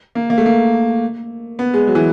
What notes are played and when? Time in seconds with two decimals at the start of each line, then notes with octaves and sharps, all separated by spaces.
0.15 A#3
0.30 A#3
0.38 A3
0.46 A#3
1.59 B3
1.74 G#3
1.87 F#3
1.95 E3